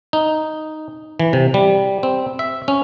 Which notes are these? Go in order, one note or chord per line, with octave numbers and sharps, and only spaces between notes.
D#4
E3
C3
G3
C4
E5
C#4